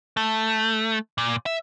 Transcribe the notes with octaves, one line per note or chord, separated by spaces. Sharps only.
A3
A#2
E5